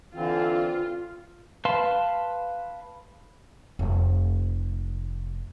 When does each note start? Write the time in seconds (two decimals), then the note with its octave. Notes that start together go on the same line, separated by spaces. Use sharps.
0.14 D3 E3 C4 F4
1.65 B4 F5 A5 C6 F6
3.79 F1 A3